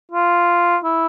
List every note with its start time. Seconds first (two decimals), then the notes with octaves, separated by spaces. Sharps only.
0.12 F4
0.85 E4